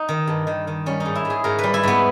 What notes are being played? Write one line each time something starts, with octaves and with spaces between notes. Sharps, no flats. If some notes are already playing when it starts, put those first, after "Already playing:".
Already playing: D#4
D#3
G2
D#3
D#3
G3 C#4
D#4
G#2
E4
G#2
G#4
G#2 A#4
G3 B4
E4
G#2 B3